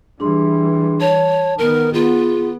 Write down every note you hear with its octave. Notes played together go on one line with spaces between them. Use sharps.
E3 G3 D4 G#4 C6
C#5 A5
D#3 B3 A#4
B3 F4 G#4